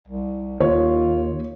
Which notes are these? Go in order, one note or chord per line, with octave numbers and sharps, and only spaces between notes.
C2
D#2 F4 C#5